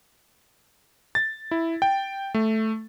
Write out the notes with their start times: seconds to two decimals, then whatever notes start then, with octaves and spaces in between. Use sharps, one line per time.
1.15 A6
1.51 E4
1.82 G5
2.34 A3